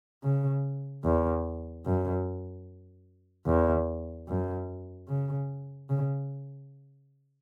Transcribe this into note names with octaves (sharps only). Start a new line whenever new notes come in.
C#3
E2
F#2
E2
F#2
C#3
C#3